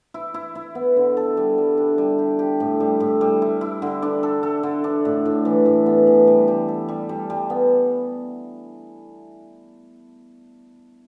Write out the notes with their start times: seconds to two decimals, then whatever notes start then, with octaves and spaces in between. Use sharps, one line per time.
0.14 E4
0.34 E4
0.55 E4
0.75 B3
0.97 D3
1.17 A4
1.37 G3
1.58 G3
1.78 D4
1.98 G3
2.19 G4
2.39 G4
2.60 A2
2.80 G3
3.00 A2
3.21 G3
3.42 E4
3.61 E4
3.82 D3
4.02 D4
4.23 A4
4.43 A4
4.63 D3
4.84 D4
5.05 A2
5.25 A2
5.45 E3
5.66 A2
5.86 B3
6.07 E3
6.27 G3
6.48 G3
6.68 A4
6.89 G3
7.09 G3
7.30 G3
7.50 B3